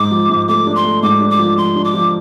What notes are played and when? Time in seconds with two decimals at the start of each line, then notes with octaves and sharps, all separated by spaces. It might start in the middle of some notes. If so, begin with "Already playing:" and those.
Already playing: G#2 D6
0.11 F3
0.29 G#2
0.48 A3 D6
0.67 D4
0.76 C6
0.84 A3
1.03 G#2 D6
1.21 D4
1.30 D6
1.39 F3
1.58 F3 C6
1.76 D4
1.85 D6
1.94 F3